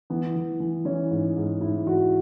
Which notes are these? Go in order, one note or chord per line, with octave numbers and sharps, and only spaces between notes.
E3 B3
E3
E3
E3 C#4
G#2
G#2
G#2 E4
E3 F#4